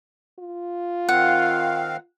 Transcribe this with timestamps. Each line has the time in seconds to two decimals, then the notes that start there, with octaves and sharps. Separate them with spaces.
0.39 F4
1.09 D#3 C4 F5 F#5